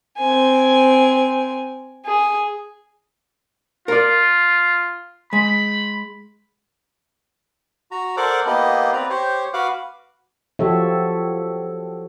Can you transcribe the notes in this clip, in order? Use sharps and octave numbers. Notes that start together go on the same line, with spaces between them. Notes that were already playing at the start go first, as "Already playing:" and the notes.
C4 G#5
G#4
F4 A#4 D5
G#3 B5
F#4 A#5
A4 A#4 C5 D5 F#5 D6
A#3 B3 E4 G4 D#5
C4 B4 D5 A#5
G4 C5 C#5
F#4 B4 F5 F#5 D6
F3 F#4 G4 A4 C#5 E5